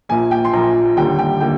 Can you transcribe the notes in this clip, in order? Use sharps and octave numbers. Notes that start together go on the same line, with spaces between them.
A#1 A#2 F3 A#3 G#5
G5
C6
A#1 A#2 F3 A#3 A#5
D#2 D3 G3 A#3 G5
G5
D3 G3 A#3 G5